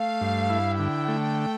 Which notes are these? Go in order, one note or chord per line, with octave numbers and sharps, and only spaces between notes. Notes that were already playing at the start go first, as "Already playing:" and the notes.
Already playing: A3 F5
G2
E4
D3 G5
A3